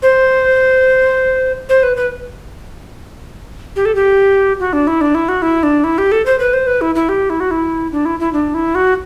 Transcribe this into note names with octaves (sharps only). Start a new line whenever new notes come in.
C5
C5
B4
B4
G4
A4
G4
F#4
D4
E4
D4
E4
F#4
E4
D4
E4
G4
A4
C5
B4
C5
B4
E4
E4
G4
E4
F#4
E4
D4
E4
E4
D4
E4
F#4